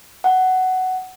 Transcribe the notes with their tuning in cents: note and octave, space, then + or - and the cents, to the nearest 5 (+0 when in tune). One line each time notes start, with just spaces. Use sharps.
F#5 +10